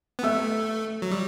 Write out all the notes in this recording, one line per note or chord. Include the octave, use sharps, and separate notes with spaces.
B3
A3 E5 E6
F#3
G3